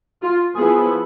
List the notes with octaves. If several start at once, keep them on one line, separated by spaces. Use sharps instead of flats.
F4
F3 B3 E4 G#4